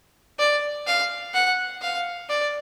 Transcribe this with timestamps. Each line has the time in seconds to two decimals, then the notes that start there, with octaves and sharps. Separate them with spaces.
0.39 D5
0.87 F5
1.34 F#5
1.82 F5
2.29 D5